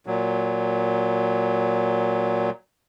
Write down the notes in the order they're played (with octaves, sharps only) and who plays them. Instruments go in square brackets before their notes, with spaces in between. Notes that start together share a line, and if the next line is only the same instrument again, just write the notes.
[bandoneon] A#2 F#3